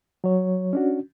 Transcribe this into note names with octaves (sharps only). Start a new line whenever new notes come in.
F#3 C#5
C#4 D4 F#4